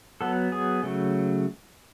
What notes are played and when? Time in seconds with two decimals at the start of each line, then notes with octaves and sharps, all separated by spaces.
0.21 F#3 B3 A4
0.52 G#4
0.83 C#3 F#3 A3